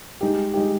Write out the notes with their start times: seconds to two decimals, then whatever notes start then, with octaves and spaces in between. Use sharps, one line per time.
0.21 G#3 D#4 G4
0.53 G#3 D#4 G4